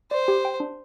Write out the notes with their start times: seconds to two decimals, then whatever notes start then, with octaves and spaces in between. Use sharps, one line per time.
0.11 C5 D5
0.28 G4
0.45 G5
0.60 D4